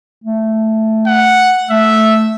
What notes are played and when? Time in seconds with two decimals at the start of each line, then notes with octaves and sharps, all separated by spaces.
0.24 A3
1.07 F#5
1.70 A3 E5